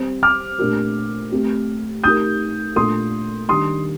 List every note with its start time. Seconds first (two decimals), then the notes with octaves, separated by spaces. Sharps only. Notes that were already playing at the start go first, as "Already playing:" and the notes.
Already playing: G3 C4 G4 C5
0.23 D6 F6
0.59 A#2 A3 D4 G4 A#4
1.31 A3 C4 G4
2.04 A3 D#4 G4 A#4 D#6 G6
2.76 A#2 A3 D4 F4 A4 C6 D#6
3.49 D#3 G3 D4 C6 D#6